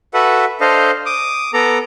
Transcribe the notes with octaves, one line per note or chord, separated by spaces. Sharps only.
F#4 A4 B4 E5 F#5
D4 A4 C5 D#5 F5
D6 D#6
B3 A4 A#5 D6